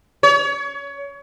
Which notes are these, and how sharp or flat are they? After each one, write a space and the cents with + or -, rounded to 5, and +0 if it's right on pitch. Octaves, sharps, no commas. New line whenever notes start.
C#5 +25